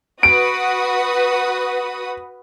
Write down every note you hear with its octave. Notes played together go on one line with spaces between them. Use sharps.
F#4 B4 D#6 D7